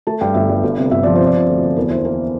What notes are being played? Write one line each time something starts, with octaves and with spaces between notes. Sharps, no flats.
A3 A5
G2 G5
G1 E5
G2
G1
C3
G1 E5
F3 D5
C3 C5
D5
C3
D2
D2
E2 A#4
E3 C5
A#3 A#4